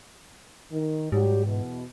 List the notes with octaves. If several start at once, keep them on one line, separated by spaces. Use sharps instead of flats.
D#3
G#2 F#3 G3 G4
E2 B2